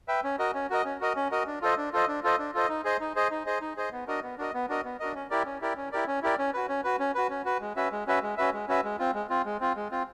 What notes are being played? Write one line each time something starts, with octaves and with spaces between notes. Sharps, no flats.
B4 E5 G5
C#4
F#4 A#4 D#5
C#4
F#4 A#4 D#5
C#4
F#4 A#4 D#5
C#4
F#4 A#4 D#5
D4
F4 A4 C5 D#5
D4
F4 A4 C5 D#5
D4
F4 A4 C5 D#5
D4
F4 A4 C5 D#5
D#4
G#4 C5 D#5
D#4
G#4 C5 D#5
D#4
G#4 C5 D#5
D#4
G#4 C5 D#5
B3
D4 F#4 A#4 D#5
B3
D4 F#4 A#4 D#5
B3
D4 F#4 A#4 D#5
B3
D4 F#4 A#4 D#5
C#4
E4 G4 A#4 D5
C#4
E4 G4 A#4 D5
C#4
E4 G4 A#4 D5
C#4
E4 G4 A#4 D5
C#4
F#4 B4
C#4
F#4 B4
C#4
F#4 B4
C#4
F#4 B4
G#3
C#4 F#4 B4 E5
G#3
C#4 F#4 B4 E5
G#3
C#4 F#4 B4 E5
G#3
C#4 F#4 B4 E5
G#3
C4 F4
G#3
C4 F4
G#3
C4 F4
G#3
C4 F4